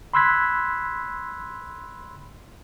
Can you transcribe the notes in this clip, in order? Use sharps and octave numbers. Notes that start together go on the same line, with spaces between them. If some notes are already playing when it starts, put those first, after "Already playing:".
B5 C6 E6 F#6 G#6 B6